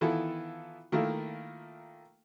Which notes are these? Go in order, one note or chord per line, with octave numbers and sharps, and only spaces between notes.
D#3 E3 B3 E4 F4 A4
D#3 A3 A#3 E4 F4 A4